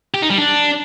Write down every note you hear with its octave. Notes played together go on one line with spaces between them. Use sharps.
G4
D#4
G3
D4